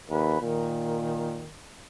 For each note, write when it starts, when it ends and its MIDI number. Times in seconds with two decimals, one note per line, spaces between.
0.10 0.41 39
0.10 0.38 71
0.42 1.43 46
0.42 1.56 51